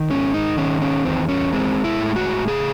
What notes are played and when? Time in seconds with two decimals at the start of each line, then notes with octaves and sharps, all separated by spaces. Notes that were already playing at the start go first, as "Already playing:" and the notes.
Already playing: D#3
0.10 G#2 C#4
0.34 D#4
0.57 D#3 C#4
0.82 C#4
1.05 E2 C4
1.29 C#4
1.53 G#3 C4
1.84 E4
2.00 A2
2.16 F#4
2.48 C#3 G#4